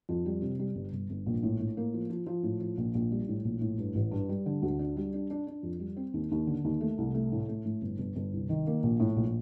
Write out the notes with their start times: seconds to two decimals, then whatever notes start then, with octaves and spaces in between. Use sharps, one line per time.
0.09 F2
0.26 G3
0.42 C3
0.59 G3
0.75 G1
0.93 G1
1.10 G1
1.26 A#1
1.43 A2
1.60 A2
1.77 A#3
1.94 F3
2.10 F3
2.27 F3
2.43 A2
2.61 F3
2.77 A#1
2.95 A#1
3.12 G3
3.28 A2
3.45 A#1
3.61 A2
3.78 G2
3.95 A1
4.11 G2
4.29 G3
4.46 D3
4.62 D2
4.79 D4
4.97 G3
5.14 D4
5.30 D4
5.47 D4
5.63 F2
5.80 G3
5.97 C4
6.14 D#2
6.31 D#2
6.47 D3
6.64 D#2
6.81 A3
6.98 C2
7.14 A3
7.32 A2
7.48 A3
7.65 A2
7.82 G1
7.98 G1
8.16 G1
8.33 C2
8.49 D#3
8.67 A#3
8.83 A#1
9.00 A2
9.16 A#1